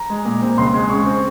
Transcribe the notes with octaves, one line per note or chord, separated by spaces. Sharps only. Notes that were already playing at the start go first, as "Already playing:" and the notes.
Already playing: A#5
G#3
A#2
C4
C#2 C6
G#3
C#3 C#6
C4